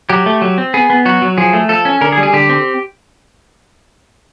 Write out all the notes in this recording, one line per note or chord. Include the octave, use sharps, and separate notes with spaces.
F#3 G4
A3
F#3
C4
B3 G#4
B3
F#3 F#4
F#3
F3 G#4
A3
F3 A4
C#4
D3 A#4
G#4
G3
G#4
D3 G4
C4